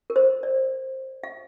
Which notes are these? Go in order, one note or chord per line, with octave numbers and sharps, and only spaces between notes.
A#4
C5
D5
F5